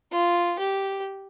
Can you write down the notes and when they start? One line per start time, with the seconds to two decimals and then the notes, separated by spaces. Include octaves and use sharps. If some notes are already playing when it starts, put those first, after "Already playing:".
0.11 F4
0.59 G4